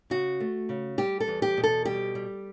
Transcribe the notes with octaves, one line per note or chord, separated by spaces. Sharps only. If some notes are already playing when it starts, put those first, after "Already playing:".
C#3 F#4
A3
C#3
G3 G4
A4
E2
G4
B2
A4
G3 G4
G3